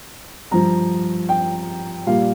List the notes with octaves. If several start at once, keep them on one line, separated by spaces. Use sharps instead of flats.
G2 F3 A#5
G5
A#2 G3 F5